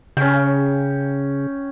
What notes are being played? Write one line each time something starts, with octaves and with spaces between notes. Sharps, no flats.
C#3 C#4 G5